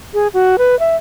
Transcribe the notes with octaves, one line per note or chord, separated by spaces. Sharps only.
G#4
F#4
B4
E5